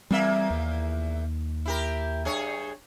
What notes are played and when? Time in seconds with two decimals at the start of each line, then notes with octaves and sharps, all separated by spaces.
0.11 E2 G3 A#3 C4 E5
0.50 D#2
1.66 E4 G4 A#4
2.25 G2 G#4 C#5